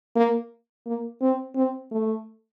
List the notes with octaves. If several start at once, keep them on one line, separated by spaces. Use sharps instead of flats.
A#3
A#3
C4
C4
A3